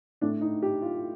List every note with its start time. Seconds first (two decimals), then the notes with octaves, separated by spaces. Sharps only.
0.21 A2 A3 D4
0.41 D#4
0.62 G4
0.82 F4